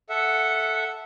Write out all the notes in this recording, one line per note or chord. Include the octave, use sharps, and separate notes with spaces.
A4 E5 F#5